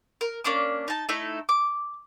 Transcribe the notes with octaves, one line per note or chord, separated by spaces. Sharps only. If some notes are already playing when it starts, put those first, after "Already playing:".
A#4
A#3 C#4 D4 D6
D#4 A5
A3 D#4 E4 A4
D6